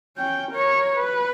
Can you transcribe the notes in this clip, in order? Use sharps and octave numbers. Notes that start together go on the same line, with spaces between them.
C#4 G5
A#4 C#5
B4